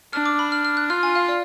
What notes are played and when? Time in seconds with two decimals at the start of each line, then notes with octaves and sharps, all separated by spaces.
0.13 D4 F6
0.26 D6
0.39 B5
0.52 F6
0.65 F6
0.77 F#6
0.90 F4 F6
1.03 G#5
1.15 F5
1.28 D5